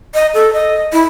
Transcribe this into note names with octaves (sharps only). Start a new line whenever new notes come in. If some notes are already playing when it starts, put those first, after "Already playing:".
D#5
A4
D#5
E4